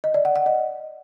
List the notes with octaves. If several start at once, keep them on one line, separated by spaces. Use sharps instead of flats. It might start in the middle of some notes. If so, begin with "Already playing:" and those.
D#5
D5
F#5
F#5
D#5